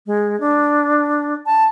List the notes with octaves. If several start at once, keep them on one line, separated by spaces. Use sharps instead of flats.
G#3
D4
A5